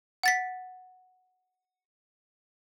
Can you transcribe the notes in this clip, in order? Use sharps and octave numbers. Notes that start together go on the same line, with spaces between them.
F#5 A6 B6